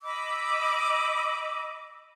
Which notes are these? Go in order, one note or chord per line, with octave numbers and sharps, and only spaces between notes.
D#5 B5 D6 E6